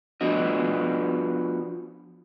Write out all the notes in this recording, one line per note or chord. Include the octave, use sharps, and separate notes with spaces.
F3 B3 D4 F#4 D#5